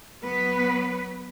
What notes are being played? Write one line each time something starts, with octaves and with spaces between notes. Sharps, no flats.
F#3 B3 B4